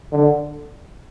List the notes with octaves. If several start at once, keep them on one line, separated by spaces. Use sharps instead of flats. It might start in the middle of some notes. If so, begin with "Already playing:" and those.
D3